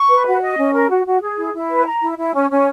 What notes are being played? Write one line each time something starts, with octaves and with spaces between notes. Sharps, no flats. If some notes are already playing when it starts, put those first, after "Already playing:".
Already playing: C#6
B4
F#4
D#5
C#4
A#4
F#4
F#4
G#4
E4
E4
B4
A#5
E4
E4
C#4
C#4